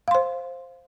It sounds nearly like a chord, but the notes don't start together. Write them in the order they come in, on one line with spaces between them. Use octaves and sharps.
F5 C6 C5